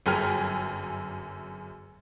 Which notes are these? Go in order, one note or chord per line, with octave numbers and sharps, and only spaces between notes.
G1 F#2 G#4 G5 G#5 F6